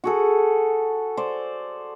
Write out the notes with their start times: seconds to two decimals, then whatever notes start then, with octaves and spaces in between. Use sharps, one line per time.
0.04 F#4 G#4 A4
1.17 C5 D5